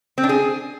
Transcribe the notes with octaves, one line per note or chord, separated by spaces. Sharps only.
C4
D4
G#4